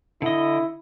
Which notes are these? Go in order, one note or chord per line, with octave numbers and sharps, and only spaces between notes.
D3 E4 D#5